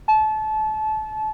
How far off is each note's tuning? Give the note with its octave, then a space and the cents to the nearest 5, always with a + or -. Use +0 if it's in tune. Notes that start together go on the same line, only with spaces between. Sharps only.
A5 -30